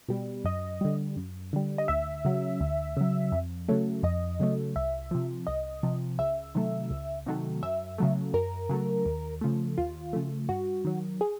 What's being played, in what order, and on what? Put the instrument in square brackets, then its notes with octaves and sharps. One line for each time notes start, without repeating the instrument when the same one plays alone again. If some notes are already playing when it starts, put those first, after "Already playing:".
[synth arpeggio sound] B2 G3
F#2 D#5
D3 G3
F#2
D3 G3
D#5
D2 E5
C#3 F#3
D2
C#3 F#3
F2
C#3 F#3 A3
F2 D#5
C#3 F#3 A3
C2 E5
C3 F3
C2 D#5
C3 F3
C#2 E5
C3 D#3 F#3 A3
C#2
C3 D#3 F#3 A3
F#2 E5
C#3 F#3 A3
F#2 A#4
C#3 F#3 A3
D#2
C#3 F3 A3
D#2 F4
C#3 F3 A3
G2 F#4
D#3 F#3
G#4